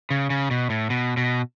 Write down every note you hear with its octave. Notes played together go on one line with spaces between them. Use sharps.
C#3
C#3
B2
A2
B2
B2